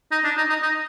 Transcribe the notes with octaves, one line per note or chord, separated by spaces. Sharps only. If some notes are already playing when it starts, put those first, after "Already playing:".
D#4
D4
D#4
D#4
D#4